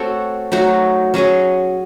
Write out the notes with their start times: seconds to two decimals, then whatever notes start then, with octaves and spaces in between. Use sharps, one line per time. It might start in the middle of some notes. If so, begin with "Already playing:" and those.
Already playing: A3 C4 F#4 A4 C#5
0.52 F#3 A3 D#4 F#4
1.14 F#3 C#4 G#4 C#5